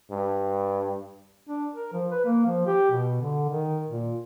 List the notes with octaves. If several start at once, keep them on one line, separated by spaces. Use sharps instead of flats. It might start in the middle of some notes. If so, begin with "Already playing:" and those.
G2
D4
A#4
F3
B4
A#3
F3
G4
B2
D3
D#3
A#2